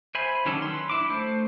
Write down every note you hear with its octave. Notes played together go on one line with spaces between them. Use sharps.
C5 E5 G#5 B5
D#3 F#3 C#4 D4 A4
B4 C6
D4 E4 D6
A3 C5